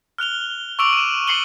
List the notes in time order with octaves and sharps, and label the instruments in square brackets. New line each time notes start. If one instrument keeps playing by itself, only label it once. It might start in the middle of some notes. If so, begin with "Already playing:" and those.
[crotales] F6 F#6 F7 G7
C#6 D6 E6 D7 F7 F#7
D#7 E7
C#6 C7 C#7 F#7 G7